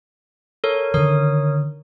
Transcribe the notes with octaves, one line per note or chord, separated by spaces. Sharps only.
A4 A#4 C#5
D3 D#3 A#4 C#5 D#6